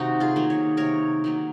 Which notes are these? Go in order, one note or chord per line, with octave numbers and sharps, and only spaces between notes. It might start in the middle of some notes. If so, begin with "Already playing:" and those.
Already playing: C3 D#3 A#3 D#4 F#4
F4 G#4
D#3 F#3 A#3
C#5
C3 A#4 C#5
D#3 F#3 A#3